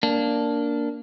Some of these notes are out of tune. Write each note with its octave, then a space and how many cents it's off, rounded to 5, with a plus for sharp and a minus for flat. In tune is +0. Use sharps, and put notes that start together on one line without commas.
A#3 +0 D4 -10